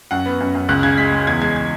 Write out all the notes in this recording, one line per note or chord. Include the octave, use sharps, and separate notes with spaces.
F#2 F#5
B3
F#2
F#2
C#2 F#6
C#3 G#6
G#3 B6
G#3
E2 G#6
G#3 G#6
G#6